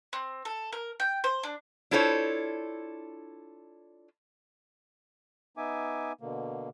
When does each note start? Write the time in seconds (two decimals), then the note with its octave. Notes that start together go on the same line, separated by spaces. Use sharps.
0.13 C4
0.45 A4
0.72 A#4
1.00 G5
1.24 C5
1.43 D4
1.91 D4 E4 F4 A4 C5 C#5
5.57 B3 D#4 E5 G#5 D6
6.21 B2 D3 A#3